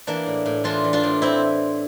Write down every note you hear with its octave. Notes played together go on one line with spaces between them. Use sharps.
E3 A#3 D4
A2
A2
E3 D4 F4
E3
D4 F4
A2
C4 E4